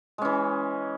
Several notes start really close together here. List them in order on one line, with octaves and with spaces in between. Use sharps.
G#3 C#4 E3